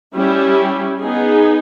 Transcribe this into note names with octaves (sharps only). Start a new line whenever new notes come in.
G3 C#4 E4 G4
B3 D#4 G#4